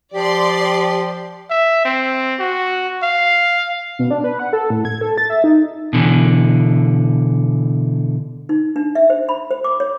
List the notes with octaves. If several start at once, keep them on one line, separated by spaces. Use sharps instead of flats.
F3 G4 D5 C6
E5
C4
F#4
F5
B2
D4
B4
F#5
A4
A2
G#6
A4
A6
E5
D#4
B2 D3 E3
D#4
D4
E5
C5
B5
C5
D6
C#5